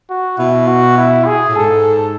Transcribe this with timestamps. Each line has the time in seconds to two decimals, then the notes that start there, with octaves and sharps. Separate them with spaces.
0.10 F#4
0.38 B2 E4
0.67 F#4
0.97 E4
1.26 G#4
1.48 A2
1.56 G#2 A4